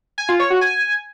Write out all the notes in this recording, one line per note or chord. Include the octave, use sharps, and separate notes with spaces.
G#5
F4
C#5
F#4
G#5